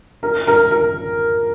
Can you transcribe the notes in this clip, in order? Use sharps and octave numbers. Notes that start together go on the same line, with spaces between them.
A#4
A#4
A#4